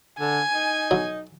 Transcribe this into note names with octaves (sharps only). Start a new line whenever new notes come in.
D3 G#5
D#4
B1 F#3